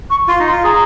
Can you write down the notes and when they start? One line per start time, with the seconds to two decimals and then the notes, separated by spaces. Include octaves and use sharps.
0.10 C#6
0.28 F4 C6
0.40 D#4
0.46 C6
0.52 F4
0.64 G#4 A#5